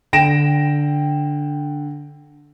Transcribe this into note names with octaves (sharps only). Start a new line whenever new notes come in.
D3 G5 A#6 D7 E7